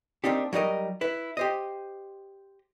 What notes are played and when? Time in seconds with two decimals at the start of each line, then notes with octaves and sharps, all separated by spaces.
0.24 A#3 C4 D4 D#4 G4
0.53 F#3 G3 D#4 A#4 D#5
1.01 E4 B4
1.37 G4 C5 D#5